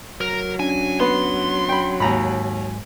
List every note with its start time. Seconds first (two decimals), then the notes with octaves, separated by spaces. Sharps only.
0.21 F#3 A#4
0.60 C#4 D4 G#5
1.00 B3 B4 C6
1.69 G5 B5
2.00 D#2 G#2 G#3 G#5 A#5 B5